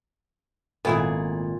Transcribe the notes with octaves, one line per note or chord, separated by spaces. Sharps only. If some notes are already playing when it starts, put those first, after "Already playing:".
G#1 A#2 A3 B3 E4 G#4